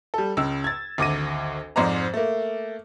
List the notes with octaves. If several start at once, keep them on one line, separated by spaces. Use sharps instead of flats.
G3 A4
C#2 C#3 E6
G#6 A6
G#1 D2 D6 A#6 D#7
F2 G#2 G#3 C5 D5 A#5
A3 A#3